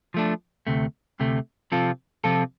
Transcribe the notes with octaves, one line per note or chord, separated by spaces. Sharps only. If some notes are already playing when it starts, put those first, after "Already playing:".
F3 A3 D4
D2 C3 A3
D2 C3 A3
C3 F3 C4 F4 A4
C3 F3 C4 F4 A4